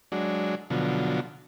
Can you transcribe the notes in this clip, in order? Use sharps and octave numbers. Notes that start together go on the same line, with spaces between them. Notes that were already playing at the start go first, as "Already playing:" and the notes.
F#3 G#3 D4
B2 D3 F3 F#3